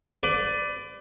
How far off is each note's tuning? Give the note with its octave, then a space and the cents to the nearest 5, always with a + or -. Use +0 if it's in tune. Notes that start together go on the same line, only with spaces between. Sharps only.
B4 +35 D5 +0